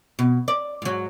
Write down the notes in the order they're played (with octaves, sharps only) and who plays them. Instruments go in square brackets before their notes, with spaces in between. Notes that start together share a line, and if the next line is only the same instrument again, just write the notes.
[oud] B2
D5
G#2 F#3